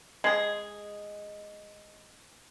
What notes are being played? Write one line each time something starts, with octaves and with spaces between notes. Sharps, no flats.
G#3 G#4